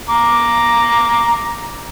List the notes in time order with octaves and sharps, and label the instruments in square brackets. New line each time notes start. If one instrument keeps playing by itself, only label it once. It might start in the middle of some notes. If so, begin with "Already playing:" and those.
[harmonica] A#5 D6